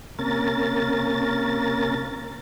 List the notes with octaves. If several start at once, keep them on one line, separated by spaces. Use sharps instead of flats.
C3 A#3 C#4 A#4 A6